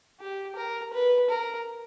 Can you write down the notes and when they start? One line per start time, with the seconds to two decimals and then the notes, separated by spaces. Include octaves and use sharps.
0.20 G4
0.56 A#4
0.93 B4
1.30 A#4